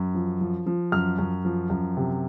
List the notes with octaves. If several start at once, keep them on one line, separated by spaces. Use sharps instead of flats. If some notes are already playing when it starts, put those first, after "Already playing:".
Already playing: F#2
F3
F3
F3
F#2 F6
F#2
F3
F#2
C3